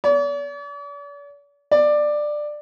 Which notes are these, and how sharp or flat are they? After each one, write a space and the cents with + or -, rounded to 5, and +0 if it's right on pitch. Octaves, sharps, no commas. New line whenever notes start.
D5 -45
D5 +15